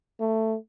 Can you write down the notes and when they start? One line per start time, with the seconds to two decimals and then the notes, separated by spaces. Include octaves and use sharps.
0.20 A3